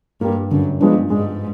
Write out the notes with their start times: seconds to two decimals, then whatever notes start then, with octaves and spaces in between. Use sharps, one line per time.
0.21 G2 G3 A#3
0.51 F#2 D3
0.80 G2 F3 G#3 B3 D4
1.10 G#2 G#3